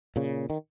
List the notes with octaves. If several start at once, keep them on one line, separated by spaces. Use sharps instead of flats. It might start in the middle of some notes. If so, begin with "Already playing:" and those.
A#2 C#3
D#3